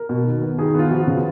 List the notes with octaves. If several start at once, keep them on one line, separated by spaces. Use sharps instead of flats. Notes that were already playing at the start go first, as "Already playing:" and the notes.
Already playing: A#4
B2
D#3
B3
D#3 G#4
B3 F4
F3 F#4
C#3